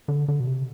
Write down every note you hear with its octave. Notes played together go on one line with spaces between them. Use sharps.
D3
D3
B2
C3